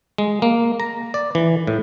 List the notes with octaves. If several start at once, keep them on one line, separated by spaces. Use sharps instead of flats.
G#3
A#3
A#5
D5
E3
A2